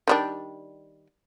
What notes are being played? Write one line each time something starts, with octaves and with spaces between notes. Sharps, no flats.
D#3 G3 D4